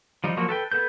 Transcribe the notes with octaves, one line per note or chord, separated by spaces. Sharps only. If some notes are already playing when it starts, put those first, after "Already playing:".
F3 G3 D#4
F3 F#3 A#3 F#4
A4 B4 G5
B3 A4 B4 G6